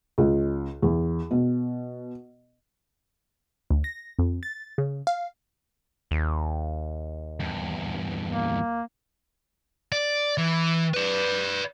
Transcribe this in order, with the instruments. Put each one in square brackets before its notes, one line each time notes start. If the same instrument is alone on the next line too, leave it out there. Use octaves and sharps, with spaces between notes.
[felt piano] C#2
E2
B2
[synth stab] D2
A#6
F2
A6
C#3
F5
[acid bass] D#2
[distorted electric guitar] E2 G2
[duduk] A#3
[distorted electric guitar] D5
E3
B4 D5